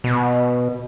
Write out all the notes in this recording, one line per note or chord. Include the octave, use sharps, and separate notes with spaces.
B2